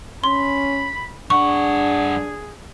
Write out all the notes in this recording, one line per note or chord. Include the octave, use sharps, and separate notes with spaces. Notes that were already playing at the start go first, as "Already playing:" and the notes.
C#4 B5 C6
G2 D4 G#4 F#5 C#6